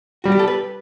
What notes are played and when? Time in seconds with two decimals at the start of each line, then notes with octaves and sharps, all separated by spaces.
0.24 G3 F#4
0.32 G4
0.39 A4
0.47 B4